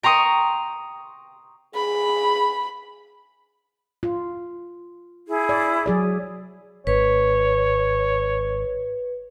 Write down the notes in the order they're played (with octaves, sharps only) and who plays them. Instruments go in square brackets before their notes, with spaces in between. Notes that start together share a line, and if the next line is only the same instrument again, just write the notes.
[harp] G5 A#5 C6 C#6 D#6
[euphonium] G#4 [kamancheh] B5
[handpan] F4
[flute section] E4 G#4
[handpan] D5
F#3 G#4 D5
[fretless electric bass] G#1 [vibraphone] B4 [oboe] C#5